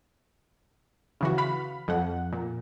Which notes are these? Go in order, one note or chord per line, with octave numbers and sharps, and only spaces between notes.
C#3 E3 F#4
F5 B5
F2 F#5
A#2